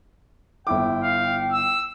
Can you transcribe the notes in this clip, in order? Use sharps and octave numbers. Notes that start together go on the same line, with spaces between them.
G1 E4 G5 D6
F5
E6